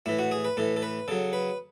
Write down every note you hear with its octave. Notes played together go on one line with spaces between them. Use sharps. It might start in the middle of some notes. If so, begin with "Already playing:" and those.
A2 E3 E4
F#4
G#4
B4
A2 E3 A4
A4
B4
C#3 F#3 A4
B4